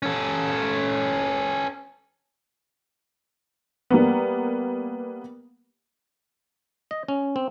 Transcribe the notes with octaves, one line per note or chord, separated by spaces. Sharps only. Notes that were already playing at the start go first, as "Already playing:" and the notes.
C#4 A4
G3 A#3 B3
D#5
C#4
C4